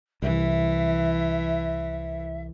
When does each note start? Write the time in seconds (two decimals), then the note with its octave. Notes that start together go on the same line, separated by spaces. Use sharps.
0.22 C2 E3 E5